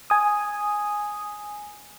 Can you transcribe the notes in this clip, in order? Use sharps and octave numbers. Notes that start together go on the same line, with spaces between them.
G#5 D#6